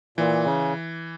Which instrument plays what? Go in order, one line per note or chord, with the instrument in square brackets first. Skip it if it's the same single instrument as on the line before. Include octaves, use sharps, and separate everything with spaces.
[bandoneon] A#2 [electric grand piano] E3
[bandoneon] C#3